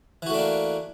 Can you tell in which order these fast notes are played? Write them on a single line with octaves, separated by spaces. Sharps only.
E3 F#4 A3 D4 A#3